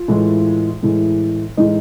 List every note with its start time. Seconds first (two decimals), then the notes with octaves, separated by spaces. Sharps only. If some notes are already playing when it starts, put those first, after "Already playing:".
Already playing: F4
0.08 A2 E3 G#3
0.83 A2 E3 G#3
1.57 A2 E3 G#3 D#4